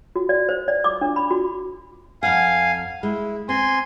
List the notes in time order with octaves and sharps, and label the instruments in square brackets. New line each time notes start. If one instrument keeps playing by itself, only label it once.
[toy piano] F#4
D5
C5
D5
D6
D4
B5
F#4
[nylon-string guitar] F2 F#5 [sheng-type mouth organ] F5 G#5
[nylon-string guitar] G#3 [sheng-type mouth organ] E4
[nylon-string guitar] C4 [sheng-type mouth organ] G#5 C6